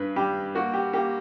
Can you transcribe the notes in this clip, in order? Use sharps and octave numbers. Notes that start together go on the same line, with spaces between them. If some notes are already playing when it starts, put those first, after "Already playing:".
Already playing: G2 B4
G3 G4
A#3 F#4
G4
A#3 G4